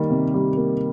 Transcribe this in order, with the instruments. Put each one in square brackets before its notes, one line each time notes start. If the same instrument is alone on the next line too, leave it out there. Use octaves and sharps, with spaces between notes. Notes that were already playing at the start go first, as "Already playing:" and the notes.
Already playing: [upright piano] D#3 G3 A#3
C3
G3
A#3